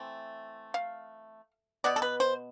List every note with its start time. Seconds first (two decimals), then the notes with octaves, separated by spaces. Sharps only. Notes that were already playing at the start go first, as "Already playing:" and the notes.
Already playing: E3 A3 C4
0.74 F5
1.84 B2 B3 D5
1.96 A4
2.02 B4
2.20 C5